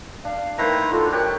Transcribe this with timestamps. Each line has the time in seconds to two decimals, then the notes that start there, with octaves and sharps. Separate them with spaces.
0.25 D4 F5
0.58 D#3 A3 E4 B4 C5 A#5
0.91 D4 F4 F#4 A4
1.12 D#3 G4 C#5 F#6